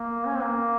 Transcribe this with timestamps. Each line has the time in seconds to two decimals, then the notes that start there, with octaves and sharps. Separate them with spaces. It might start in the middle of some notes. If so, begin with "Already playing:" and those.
Already playing: A#3
0.27 C#4
0.35 C4
0.43 A#3